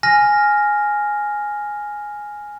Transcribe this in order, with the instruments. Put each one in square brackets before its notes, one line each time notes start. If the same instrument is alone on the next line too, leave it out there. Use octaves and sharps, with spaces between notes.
[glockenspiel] G#5 F6 A#6